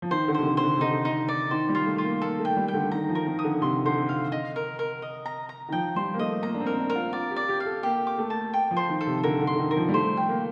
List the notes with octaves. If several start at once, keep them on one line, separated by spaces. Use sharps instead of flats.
F3
D#3 C5
D3
C3 C5
D3
C5
D3
C3
D3 D#4
D#4
D5
D#3 C5
G3
F4
A3
F4
A#3
A#3 A4
A3
G5
G3
G5
D3
D#3 A#5
F3
A#4
D#3
D#6
D3
C3 C6
D3 C5
F5
D#5
A#4
A#4
D#5
A#5
A#5
D#3
F3 G5
G3 C5
A#3
A3 D#5
A#3 A#5
D4
C4
A#4
C4
D4
A#4
F4
F4 D5
G4
D5
G4
F5
A4
A#3 G4
D6
A3
A5
G5
F3
C5
D#3
A4
C3
D3 A#4
D3
C6
D3
D#3
A#4
F3
G3
A3 C5
G5
A#3